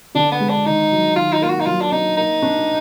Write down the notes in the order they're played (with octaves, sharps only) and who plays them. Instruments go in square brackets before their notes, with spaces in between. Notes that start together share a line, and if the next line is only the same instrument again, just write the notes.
[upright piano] D3 [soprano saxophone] D4
[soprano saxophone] B3
[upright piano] G#3
[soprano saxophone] D4
[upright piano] D#3 [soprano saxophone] D#4
[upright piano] F#3
[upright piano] D#3 [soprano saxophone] F4
[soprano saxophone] D#4
[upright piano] A#3 [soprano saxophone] F4
[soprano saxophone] F#4
D#4
[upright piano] F#3 [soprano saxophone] F4
[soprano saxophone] D4
[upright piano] D4 [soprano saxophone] D#4
[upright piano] A#3 [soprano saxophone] D#4
[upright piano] D4